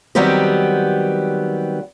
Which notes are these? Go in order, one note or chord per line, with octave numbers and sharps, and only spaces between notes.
D#3 F#3 G3 B3 C4 G4